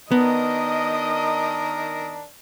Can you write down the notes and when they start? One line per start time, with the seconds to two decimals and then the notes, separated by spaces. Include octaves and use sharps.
0.12 D#3 B3 D4 A#4 D#5 D#6